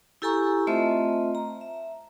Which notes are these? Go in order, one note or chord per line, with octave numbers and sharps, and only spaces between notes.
E4 G4 A4 G#5 A#5 C#6
A3 C4 F4 C5 D#5 E5
A#5
E5